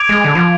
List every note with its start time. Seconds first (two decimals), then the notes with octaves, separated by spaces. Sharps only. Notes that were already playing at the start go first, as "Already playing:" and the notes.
Already playing: D6 G#6 D7 F7
0.09 G#3
0.24 D3
0.35 F3